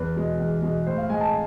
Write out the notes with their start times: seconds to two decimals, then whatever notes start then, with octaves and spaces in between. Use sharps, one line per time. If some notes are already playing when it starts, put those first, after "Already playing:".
Already playing: E2 B4
0.16 B2 G#3
0.40 E2
0.62 B2 G#3
0.86 A2 C5
0.98 F5
1.09 G#3 G#5
1.21 A5